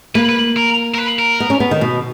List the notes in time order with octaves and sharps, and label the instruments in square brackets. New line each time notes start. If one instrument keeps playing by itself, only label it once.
[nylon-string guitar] A#3 [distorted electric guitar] B4
[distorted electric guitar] B4
A#4
A#4
B4
A#4
[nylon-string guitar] B3
C#4
B3
D#3
B2